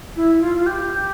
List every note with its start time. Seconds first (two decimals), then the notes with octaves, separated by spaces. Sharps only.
0.16 E4
0.41 F4
0.55 F4
0.66 G4